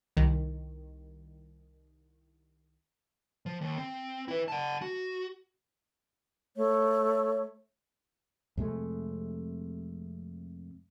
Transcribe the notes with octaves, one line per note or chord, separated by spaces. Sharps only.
C2 D#3
F3
D#2
C4
E4 B4
F#5 A5
F#4
A3 C#5
F2 C3 G#3 A3